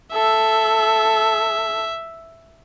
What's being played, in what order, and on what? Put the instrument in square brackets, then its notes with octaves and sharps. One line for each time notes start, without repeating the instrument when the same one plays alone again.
[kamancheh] A4 [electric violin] E5